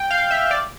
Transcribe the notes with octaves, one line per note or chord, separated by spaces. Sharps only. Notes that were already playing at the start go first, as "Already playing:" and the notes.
Already playing: G5
F5
E5
D5